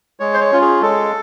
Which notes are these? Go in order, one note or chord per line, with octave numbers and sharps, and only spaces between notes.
G#3 C#5
C5
C#5
C#4 F4
G#4
G#3 A4